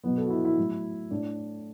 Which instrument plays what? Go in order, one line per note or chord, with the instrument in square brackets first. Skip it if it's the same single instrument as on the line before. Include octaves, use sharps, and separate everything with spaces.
[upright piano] B2 F#3 B3
A4
F#4
E4
E4
A2 F#3
A2 D4